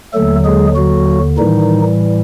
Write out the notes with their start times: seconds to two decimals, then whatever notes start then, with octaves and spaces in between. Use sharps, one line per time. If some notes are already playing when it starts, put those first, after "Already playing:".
0.14 D#2 D3 F#3 A3 A4
0.45 G#3 G#4
0.76 F#3 F#4
1.38 A2 D#3 E3 G3 D#4